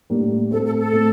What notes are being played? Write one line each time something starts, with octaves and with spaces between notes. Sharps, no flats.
A2 G3 A#3 D4
A2 A3 C4 A4
A4
A4
A2 A3 C4